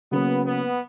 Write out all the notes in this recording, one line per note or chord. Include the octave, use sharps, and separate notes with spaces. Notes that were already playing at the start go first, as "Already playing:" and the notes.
C#3 F#3 A#3 B3 C#4
B3